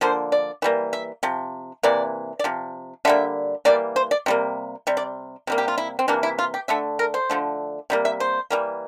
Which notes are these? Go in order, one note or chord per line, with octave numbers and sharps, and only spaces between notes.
D3 F3 A#3 C5
D5
E3 G3 A#3
E5
C3 F3
C3 E3 A#3 D5
D5
C3 F3
D3 G3 A#3 E5
E3 G3 A#3 D5
C5
D5
C3 G3 A#3
C3 G3
D5
C3 G3 A#3
G4
F4
E4
C4
C3 E3 A#3 D4
E4
F4
G4
D3 A3 E5
A#4
C5
D3 F3 A3
C3 G3 A#3
E5
C5
E3 G3 A#3